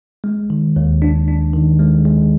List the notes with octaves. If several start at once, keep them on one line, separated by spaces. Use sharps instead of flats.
G#3
D#3
D#2
D4
D4
D#3
G#3
G#3